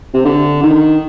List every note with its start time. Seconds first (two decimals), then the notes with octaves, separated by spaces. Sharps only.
0.14 C3
0.25 D3
0.63 D#3